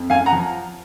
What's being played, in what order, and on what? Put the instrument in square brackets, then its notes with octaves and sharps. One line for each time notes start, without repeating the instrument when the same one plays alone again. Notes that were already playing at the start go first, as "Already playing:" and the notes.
Already playing: [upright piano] F2
F#2 F5 G#5
F#5 A#5
F3